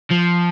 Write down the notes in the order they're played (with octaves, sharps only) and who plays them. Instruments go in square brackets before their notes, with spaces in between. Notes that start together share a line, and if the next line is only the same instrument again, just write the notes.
[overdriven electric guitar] F3